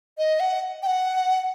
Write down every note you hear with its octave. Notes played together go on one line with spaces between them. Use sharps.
D#5
F#5
G5
F#5